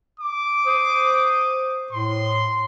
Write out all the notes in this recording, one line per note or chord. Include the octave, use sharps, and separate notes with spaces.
D6
C5 D#6
A2 C6